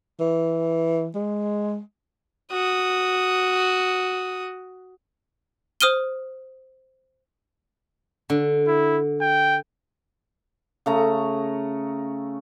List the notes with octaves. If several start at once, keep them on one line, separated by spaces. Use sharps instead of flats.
E3
G#3
F#4 D#6
C5 D#6 F6 D#7 G7
D3
E4
G5
C#3 A3 A#5